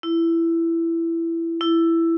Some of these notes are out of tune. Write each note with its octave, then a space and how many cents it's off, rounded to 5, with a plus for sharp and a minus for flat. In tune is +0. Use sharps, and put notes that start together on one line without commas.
E4 +15
E4 +10